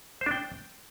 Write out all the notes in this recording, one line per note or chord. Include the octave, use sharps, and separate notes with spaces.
C5
D4
G5